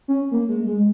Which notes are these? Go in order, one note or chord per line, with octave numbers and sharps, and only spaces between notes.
C#4
A#3
G#3
G#3